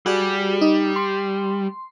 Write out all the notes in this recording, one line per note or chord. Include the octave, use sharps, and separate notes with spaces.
G3 F#4 G#4 D5
D#4
C6